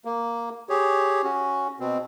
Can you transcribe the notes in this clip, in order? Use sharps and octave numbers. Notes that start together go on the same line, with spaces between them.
A#3
G4 G#4 C#5
C#4 F#4
B2 C4